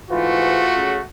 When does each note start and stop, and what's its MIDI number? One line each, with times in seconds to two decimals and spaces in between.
0.10 0.67 44
0.10 0.67 52
0.10 1.05 57
0.10 0.89 65
0.10 1.05 66
0.75 0.98 49